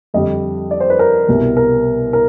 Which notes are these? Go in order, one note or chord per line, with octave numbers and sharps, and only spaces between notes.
F2 D3 G3 D#5
D5
C5
B4
A#4
C2 B2 G3
A#4
A#4